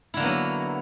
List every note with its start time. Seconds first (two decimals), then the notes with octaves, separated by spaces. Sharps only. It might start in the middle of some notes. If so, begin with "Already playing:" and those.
0.14 E4
0.17 D3
0.20 A#3
0.22 B3
0.25 F#3